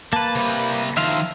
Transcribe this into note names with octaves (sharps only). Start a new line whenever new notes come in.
A#3 B4 A5
C3 G3
D#3 F3 E5 F5 C6